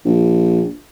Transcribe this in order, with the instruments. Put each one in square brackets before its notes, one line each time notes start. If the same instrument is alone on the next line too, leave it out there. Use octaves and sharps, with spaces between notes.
[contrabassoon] A#1